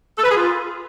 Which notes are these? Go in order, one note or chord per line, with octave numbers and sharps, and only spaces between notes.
A4
B4
G#4
F4